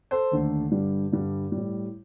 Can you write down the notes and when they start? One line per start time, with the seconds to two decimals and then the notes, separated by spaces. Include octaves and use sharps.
0.11 A4 C5
0.32 D#2 D3 A3
0.71 G2 D3 G3
1.12 G2 D3 G3
1.52 A2 G3